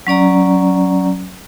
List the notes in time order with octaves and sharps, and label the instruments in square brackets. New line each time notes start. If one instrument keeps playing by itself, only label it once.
[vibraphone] F#3 C#4 D5 A#5